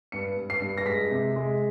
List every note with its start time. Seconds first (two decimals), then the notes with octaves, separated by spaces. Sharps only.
0.12 G2 C#7
0.38 G2
0.50 C7
0.62 G2
0.78 A#6
0.86 G#3 B6
1.11 C3
1.36 G#3